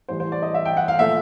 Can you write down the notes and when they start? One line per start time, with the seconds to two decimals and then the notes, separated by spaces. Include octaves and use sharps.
0.08 A2 E3 G3 C5
0.20 C5
0.32 D5
0.42 D#5
0.54 E5
0.65 G5
0.77 F#5
0.88 F5
0.99 A#2 F3 A3 E5